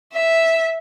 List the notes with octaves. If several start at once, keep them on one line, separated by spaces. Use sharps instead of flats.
E5